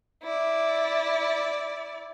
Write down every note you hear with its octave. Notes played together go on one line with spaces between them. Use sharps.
E4 D5